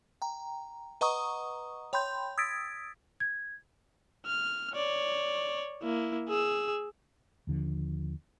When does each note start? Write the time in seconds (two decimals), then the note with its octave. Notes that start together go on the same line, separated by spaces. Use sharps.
0.22 G5 A#5
1.01 B4 D#5 F#5 A#5 C#6 D#6
1.93 C#5 G5 B5 C6 G6
2.38 D#6 E6 G#6 A6 B6 D7
3.20 G#6
4.26 F6
4.74 C#5 D5
5.83 A#3 E4
6.28 G#4 E6
7.47 D#2 D3 F3